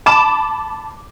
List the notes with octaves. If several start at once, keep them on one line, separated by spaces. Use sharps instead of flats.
A5 B5 D6 E7